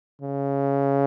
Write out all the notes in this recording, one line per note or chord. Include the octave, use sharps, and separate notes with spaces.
C#3